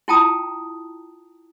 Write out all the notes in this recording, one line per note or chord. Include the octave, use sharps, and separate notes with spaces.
E4 F4 G5 A5 A#5 D#6